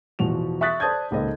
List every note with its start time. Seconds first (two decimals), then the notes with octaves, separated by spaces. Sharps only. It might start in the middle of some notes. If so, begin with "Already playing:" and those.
0.19 E2 B2 F3 F#4 F7
0.61 E5 C#6 D#6 F#6 A6 B6
0.80 C5 D5 A5 D#6 G6 G#6
1.11 G#1 C#2 A#3 A4 C5 D#5